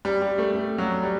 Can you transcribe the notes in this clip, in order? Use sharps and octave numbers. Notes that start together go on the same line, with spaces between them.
G3
G3
A3
A3
F#3
G3